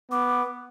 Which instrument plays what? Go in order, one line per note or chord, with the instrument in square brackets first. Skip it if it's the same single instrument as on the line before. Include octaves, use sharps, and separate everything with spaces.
[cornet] B3 [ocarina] D6